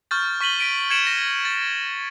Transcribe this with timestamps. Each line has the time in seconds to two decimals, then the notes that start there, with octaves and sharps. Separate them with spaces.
0.11 C#6 F6 G6 A6
0.41 C#6 B6 D#7 F#7 G7
0.59 B6 D7 D#7
0.90 G#6 A6 C#7 D7 E7 F#7
1.07 A#6
1.45 A6